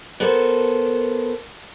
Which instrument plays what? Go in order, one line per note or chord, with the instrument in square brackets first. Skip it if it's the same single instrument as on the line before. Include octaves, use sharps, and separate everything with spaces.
[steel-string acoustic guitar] B3 F#4 A4 A#4 C5